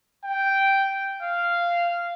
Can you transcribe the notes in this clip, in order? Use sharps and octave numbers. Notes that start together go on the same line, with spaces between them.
G5
F5